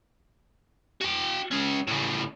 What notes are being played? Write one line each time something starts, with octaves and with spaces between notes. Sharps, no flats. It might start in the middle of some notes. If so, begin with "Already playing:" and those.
F#4 G5
G#3 C#4
A2 C#3